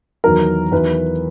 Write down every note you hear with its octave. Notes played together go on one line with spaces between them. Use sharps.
E2 D#3 F#3 A#4
E2 D#3 F#3 B4